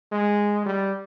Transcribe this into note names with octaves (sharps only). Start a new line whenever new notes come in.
G#3
G3